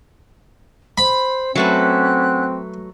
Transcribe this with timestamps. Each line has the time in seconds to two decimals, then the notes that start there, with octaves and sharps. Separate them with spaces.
0.98 C5 B5
1.55 F#3 A3 C4 C#4 B4 F#5 F#6